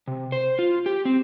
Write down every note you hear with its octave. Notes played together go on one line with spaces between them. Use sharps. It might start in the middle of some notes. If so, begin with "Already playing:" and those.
C3
C5
F4
G4
C4